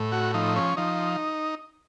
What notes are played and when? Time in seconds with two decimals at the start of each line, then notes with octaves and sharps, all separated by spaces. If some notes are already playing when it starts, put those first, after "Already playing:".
Already playing: A2
0.12 F#4
0.34 F3 D#4
0.56 C#4
0.77 F3 D#4